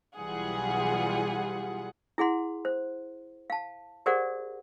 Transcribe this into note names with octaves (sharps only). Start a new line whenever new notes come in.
B1 E3 G3 F4 G#4 F#5
E4 G#4 F#5 C6
C5
F5 A5
G4 G#4 A#4 C5 D5 F#5